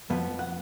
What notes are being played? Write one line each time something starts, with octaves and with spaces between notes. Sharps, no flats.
F2 F3 B3
F#5